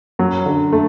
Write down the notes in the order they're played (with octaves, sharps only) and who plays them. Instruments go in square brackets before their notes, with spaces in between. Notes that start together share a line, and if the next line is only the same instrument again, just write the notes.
[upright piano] F#2 F#3
D3
A3